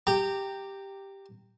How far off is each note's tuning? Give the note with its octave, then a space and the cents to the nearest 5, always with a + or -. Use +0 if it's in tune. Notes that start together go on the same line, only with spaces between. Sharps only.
G4 +0 A#5 -20